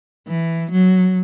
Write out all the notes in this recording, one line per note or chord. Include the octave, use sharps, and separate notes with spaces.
E3
F#3